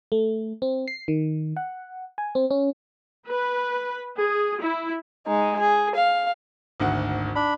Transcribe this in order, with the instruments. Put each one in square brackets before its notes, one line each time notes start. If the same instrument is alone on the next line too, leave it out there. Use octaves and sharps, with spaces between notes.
[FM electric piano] A3
C4
C7
D#3
F#5
G#5
C4
C#4
[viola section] B4
G#4
E4
[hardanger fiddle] G#3 D#4
G#4
F5
[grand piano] G#1 D2 F#5
[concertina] D4 B5